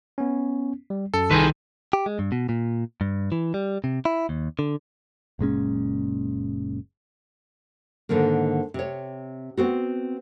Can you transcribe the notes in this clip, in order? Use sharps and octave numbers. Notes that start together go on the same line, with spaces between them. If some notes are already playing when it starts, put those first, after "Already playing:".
B3 C#4
G3
F#2 A4
C2 D#3 G#4 B4 C6 G6
G4
G#3
G2
B2
A#2
G2
E3
G3
C3
E4
D#2
D3
F#1 A#2 G#3 C#4
G#2 D3 D#3 A#3
C3 C#5
B3 C4 F#4